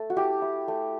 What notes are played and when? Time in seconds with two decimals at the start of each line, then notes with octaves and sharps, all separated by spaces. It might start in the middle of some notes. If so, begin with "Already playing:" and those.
Already playing: A3 A4
0.10 F#4
0.16 E4 G4
0.42 E4
0.68 A3